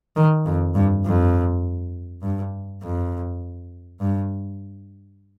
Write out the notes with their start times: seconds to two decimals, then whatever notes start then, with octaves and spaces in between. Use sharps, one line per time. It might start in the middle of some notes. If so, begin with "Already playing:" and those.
0.16 D#3
0.46 F2
0.75 G2
1.06 F2
2.23 G2
2.83 F2
4.01 G2